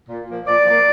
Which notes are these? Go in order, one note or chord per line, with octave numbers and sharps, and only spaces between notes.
A#2
F3 A#3
A#2 D5
F3 A#3